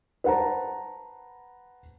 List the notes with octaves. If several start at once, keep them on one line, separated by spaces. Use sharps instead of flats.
B4 C5 F#5 A5 A#5